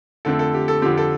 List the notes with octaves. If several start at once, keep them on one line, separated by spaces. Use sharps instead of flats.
F2 D3 A3 C4 A4
A4
G4
A4
F2 D3 F3 C4 G4
A4